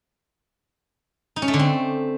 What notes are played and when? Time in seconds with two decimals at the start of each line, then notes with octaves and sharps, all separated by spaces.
1.36 D#4
1.42 C#4
1.48 A3
1.54 D3
1.59 C4